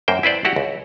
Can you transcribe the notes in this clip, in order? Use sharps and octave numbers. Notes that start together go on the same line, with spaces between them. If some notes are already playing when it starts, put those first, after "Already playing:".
F#2 A#3 C5 G5
E4 B4 C5 D5
E4 F#4 G4 F#5
C#2